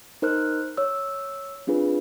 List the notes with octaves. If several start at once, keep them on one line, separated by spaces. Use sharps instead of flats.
D#4 A#4 C5 F6 F#6
C#5 E6
C4 D4 F4 G#4 B4